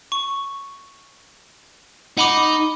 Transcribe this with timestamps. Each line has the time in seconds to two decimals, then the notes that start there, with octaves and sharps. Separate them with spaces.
0.12 C#6
2.17 D#4 F#5 B5 D6